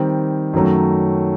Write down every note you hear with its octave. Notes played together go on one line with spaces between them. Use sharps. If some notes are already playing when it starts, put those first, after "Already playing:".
Already playing: D#3 G3 C4
F#2 D#3 F#3 A3 C#4